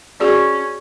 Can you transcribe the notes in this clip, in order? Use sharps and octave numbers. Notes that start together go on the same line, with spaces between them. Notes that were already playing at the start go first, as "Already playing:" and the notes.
C#4 F#4 G#4 D5